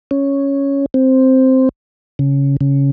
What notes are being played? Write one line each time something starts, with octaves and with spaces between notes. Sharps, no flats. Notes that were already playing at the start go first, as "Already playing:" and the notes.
C#4
C4
C#3
C#3